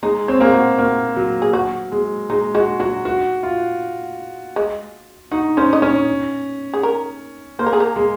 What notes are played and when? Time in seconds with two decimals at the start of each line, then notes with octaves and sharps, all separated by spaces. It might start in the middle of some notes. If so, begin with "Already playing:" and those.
0.03 G#3 D#4
0.28 C4 C#5
0.40 A#3 G#4
0.54 F#4
0.78 A#3 F#4
1.16 F#3
1.42 G#4
1.53 F#3 F#4
1.92 G#3
2.30 G#3 D#4
2.54 G#3 F#4
2.80 F#3 F#4
3.05 F#4
3.43 F4
4.56 G#3
5.31 D#4 F#4
5.57 C#4 C5
5.73 D#5
5.82 C#4 C#5
6.73 G#4
6.83 A#4
7.59 A#3 C5
7.66 A#4
7.73 G#4
7.80 A#4
7.96 G#3